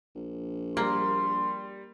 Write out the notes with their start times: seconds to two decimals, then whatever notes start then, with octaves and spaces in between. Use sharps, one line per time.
0.15 A#1
0.77 G3 A#3 C6